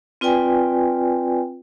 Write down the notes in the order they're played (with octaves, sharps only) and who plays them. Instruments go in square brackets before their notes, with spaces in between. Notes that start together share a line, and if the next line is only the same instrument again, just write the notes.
[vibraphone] C4 F4 B4 D5 G5 G#5